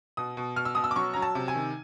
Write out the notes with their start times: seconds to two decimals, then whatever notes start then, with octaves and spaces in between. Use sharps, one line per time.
0.17 B2 D#6
0.37 B2
0.56 B2 F6
0.65 E6
0.75 B2 D#6
0.84 E6
0.91 D6
0.96 F#3 C#6
1.14 F#3 A#5
1.22 A5
1.35 C3
1.48 G#5
1.55 D#3